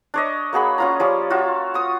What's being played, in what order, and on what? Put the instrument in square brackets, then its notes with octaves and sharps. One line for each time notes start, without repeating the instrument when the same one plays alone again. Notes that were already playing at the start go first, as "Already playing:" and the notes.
[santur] D4 C#5 D#5
A#3 F#4 G#4 B5
C#4 F4 A#5
F3 G3 C#4
F4 F#4 E5
C#6 D#6